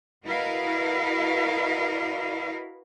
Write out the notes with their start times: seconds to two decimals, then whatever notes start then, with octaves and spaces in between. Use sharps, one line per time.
0.25 E4 F#4 A#4 B4 D#5 F5